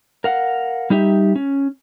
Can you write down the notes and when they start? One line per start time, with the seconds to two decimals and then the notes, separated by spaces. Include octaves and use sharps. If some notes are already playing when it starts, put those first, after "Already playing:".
0.24 A#4 F5 F#5
0.90 G3 D#4 G4 E5
1.36 C#4